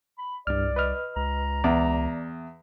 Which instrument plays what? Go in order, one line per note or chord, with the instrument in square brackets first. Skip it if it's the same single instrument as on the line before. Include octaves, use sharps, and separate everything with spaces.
[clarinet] B5
[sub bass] C2 [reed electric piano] G2 F6 [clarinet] D5
[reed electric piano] B4 D#5 F6
[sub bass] C#2 [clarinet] A#5
[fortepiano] E2 [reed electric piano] D5